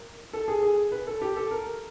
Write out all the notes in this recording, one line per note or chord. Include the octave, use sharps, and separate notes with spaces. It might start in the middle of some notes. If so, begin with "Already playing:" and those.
Already playing: A#4
A4
G#4
G#4
B4
A4
G4
A4
A#4